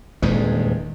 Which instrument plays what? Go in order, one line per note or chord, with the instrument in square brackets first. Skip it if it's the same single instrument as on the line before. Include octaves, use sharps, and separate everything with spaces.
[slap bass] D#1 E2 G2 G#3